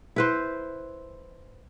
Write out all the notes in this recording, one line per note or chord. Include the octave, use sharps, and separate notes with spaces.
E4 B4 C5